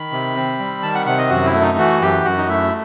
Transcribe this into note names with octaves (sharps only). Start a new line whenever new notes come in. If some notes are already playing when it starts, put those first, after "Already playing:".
Already playing: D#3 B5
C3
C4
G3
D#3 A5
F#5
C3 F#5
D#5
F#2 F#4
E4
A3
D#4
E3 F#4
F#2 G4
F#2 F#4
D#4
A3 E4